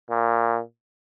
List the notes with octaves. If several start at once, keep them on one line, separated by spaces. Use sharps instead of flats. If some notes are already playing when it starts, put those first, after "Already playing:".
A#2